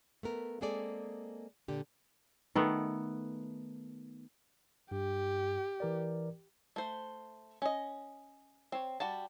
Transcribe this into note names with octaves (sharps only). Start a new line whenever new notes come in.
A3 B3 A#4
G#3 A#3 C4 G#4 A4 D5
A#2 D3 G4
D#3 A3 B3
G2 G4
E3 A#4 D5
A3 C5
C#4 D#5
C4 C#5
G3 F#4 A5